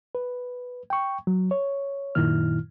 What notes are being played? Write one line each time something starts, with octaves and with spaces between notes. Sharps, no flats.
B4
G5 C#6
F#3
C#5
F#2 A#2 D#3 E4 F6